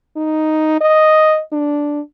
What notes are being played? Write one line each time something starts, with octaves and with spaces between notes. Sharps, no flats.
D#4
D#5
D4